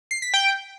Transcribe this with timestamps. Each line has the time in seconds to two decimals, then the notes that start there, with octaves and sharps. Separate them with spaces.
0.11 C7
0.22 B6
0.34 G5